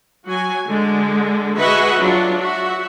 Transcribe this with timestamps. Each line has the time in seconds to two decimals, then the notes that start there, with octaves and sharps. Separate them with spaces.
0.27 F#3 F#4 G#5
0.67 D3 G#3
1.57 F#4 G#4 B4 D#5 E5 F#5
1.99 F#3 D4 F4
2.41 F#4 E5